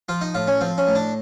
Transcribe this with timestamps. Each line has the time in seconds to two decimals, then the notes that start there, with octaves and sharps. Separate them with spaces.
0.09 F3 F4
0.21 D#4
0.34 A2 F4
0.47 C#4
0.61 F3 C4
0.78 C#4
0.87 A2
0.95 D4